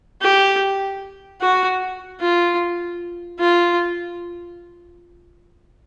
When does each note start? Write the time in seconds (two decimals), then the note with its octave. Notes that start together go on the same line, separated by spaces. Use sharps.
0.22 G4
1.42 F#4
2.20 F4
3.40 F4